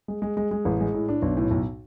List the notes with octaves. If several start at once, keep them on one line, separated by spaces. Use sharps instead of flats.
G#3
G#3
G#3
G#3
A1
G#3
A2
D4
B1
A2
B1